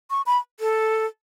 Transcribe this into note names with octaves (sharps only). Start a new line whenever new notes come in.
C#6
B5
A4